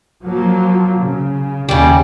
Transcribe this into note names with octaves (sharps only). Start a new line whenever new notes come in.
F3 F#3 A#3
C#3
D#2 C#3 G3